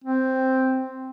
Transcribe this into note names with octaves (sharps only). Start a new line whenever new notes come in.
C4